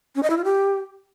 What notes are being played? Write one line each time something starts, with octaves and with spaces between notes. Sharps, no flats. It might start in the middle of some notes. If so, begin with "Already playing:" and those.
C#4
D#5
E4
F4
G4